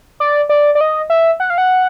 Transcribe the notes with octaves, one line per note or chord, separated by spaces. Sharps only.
D5
D5
D5
D#5
E5
F#5
F5
F#5